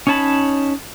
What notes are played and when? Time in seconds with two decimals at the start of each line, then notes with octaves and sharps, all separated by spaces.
0.07 C#4 D#4 C#5 A5 B5